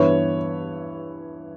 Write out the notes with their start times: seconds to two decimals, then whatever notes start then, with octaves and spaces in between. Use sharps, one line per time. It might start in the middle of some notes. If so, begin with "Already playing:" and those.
Already playing: G2 E3 B3 E4 C#5